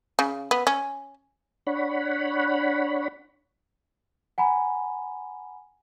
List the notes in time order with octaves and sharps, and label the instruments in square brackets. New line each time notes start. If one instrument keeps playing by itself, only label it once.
[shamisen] C#3
B3
C#4
[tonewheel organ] D4 C#5 F#5 B5
[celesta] F#5 G#5 A#5 B5